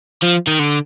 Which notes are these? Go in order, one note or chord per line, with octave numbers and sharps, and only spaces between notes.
F3
D#3
D3